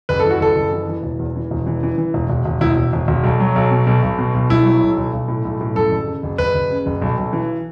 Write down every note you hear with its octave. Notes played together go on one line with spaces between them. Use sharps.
F#1 B4
A4
E3
F#4
F#1 A4
F#1
E3
E3
E1
E2
E3
E1
E3
E3
E3
E1
E1
E1
E1 E4
E1
E1
E1
B1
F#3
B1
B2
B1
B1
B2
B1
B1 E4
F#3
B1
B1
B1
A2
B1
A2
F#2 A4
F#1
C#3
F#1
F#1 B4
F#1
C#3
F#1
B1
B1
E3